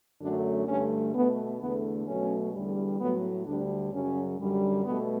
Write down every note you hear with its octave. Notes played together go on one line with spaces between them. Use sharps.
F#2 D3 F#3 A3 D4
G2 D3 A3 C#4
B2 A3 B3
E2 D3 A3 B3
B2 F#3 A3 C#4
E2 D3 G3
A2 F#3 A3 B3
D2 D3 G3 D4
F#2 C#3 F#3 C#4
F#2 D3 G3
B2 A3 B3